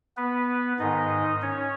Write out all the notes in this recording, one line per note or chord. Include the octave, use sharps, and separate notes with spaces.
B3 B4
G#2 D#3 D#4 D#5
C#4 C#5